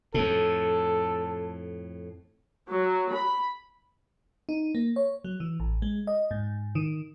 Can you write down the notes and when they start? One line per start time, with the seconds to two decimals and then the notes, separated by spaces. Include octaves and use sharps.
0.14 F2 A2 A4
2.69 F#3
3.14 B5
4.49 D#4
4.75 A#3
4.96 C#5
5.24 F#3
5.40 E3
5.60 A1
5.82 G#3
6.07 D#5
6.31 G#2
6.75 D#3